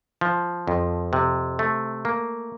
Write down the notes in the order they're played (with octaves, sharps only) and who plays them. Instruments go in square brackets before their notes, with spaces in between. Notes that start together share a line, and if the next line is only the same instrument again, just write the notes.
[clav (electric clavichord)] F3
F2
C3
A3
A#3